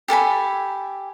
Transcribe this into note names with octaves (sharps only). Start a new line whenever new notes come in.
G4 A4 G#5 B5